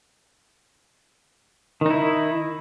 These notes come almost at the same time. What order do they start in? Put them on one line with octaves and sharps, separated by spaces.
D#3 D#4 E4